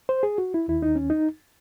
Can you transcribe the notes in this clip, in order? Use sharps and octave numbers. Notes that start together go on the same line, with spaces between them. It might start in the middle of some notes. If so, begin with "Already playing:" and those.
C5
G#4
F#4
E4
D#2 D#3 E4
D#4
C#4
D#4